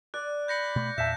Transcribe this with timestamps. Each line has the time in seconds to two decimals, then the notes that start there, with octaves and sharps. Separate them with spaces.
0.14 D5 F#6
0.48 B5 G6 A#6 C#7
0.76 B2 A3
0.98 E2 A#2 E5 F5 A5 G6